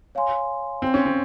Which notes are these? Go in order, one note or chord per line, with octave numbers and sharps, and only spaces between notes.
C#5 F5 G#5 C6
C4
C#4
C4